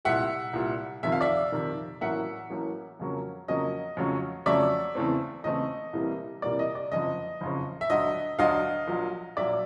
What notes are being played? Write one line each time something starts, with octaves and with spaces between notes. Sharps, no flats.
C2 A#2 G3 E5 F#5
C2 A#2 G3
F2 C3 D#3 E5
F5
D5 E5
F2 C3 D#3
A1 A2 F#3 A#3 C#4 E5 F#5
A1 A2 F#3 A#3 C#4
F2 C#3 F#3 A#3 C#4
F2 C#3 F#3 A#3 C#4 D#5
F2 C#3 F#3 A3 C#4
F2 C#3 F#3 A3 C#4 D5 E5
E2 C#3 E3 A3 C4
E2 C#3 E3 A3 C4 D#5
C2 C3 E3 G3 A#3
C2 C3 E3 G3 A#3 D5
D#5
D5
F#1 F2 C#3 D#5
F#1 F2 C#3
E5
D2 D3 F#3 D#5
D2 D3 F#3 D#5 F5
A#1 A#2 F#3
A#1 A#2 F#3 D5 E5